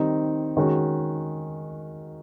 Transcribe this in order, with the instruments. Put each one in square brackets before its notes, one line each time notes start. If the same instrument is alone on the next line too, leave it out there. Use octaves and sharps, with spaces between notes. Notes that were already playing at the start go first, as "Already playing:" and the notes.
Already playing: [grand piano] D#3 G3 C4 D#4
D#3 G#3 C#4 F#4